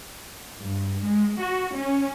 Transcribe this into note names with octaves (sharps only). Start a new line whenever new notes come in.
G2
G#3
F#4
C#4